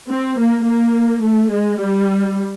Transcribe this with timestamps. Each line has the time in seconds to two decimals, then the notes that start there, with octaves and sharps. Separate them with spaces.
0.10 C4
0.39 A#3
0.67 A#3
1.24 A3
1.52 G#3
1.80 G3